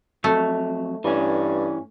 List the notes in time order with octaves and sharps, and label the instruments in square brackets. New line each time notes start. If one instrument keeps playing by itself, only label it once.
[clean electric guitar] F2 F#3 [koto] A3
[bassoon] G2 [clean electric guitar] E3 C#4